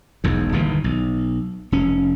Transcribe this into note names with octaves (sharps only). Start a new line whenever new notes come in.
E1 B1 E2
G1 D#2 A#2 E3
B1
F1 C#4